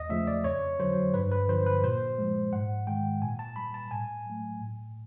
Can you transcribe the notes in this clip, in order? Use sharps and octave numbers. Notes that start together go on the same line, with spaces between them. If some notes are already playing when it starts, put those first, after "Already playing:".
Already playing: E2 D#5
C#3 F3 A3 E5
D5
F2 C#5
D3 F#3 C5
G2 B4
B4
D3 F3 C5
B4
A#2 C5
F3 G#3
G#2 F#5
D#3 G#3 G5
A#2 G#5
A5
G3 B5
A5
A2 G#5
F#3 A3
A2